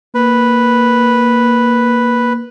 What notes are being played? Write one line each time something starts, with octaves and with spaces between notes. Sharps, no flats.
A#3 B4